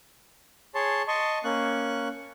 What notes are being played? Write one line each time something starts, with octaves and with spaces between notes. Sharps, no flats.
G#4 C#5 A5 C6
D#5 A5 C6 C#6
A#3 C#4 C#6 F#6